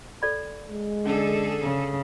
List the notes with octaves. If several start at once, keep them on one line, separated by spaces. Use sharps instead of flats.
A4 D5 B5
G#3
D3 C#4 G#4 A4
C#3